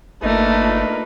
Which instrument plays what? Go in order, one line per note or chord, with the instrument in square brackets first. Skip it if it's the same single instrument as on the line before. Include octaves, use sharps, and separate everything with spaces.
[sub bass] G1 [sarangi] A3 [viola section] A#3 F4 A#4 [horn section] D4 D#4 B4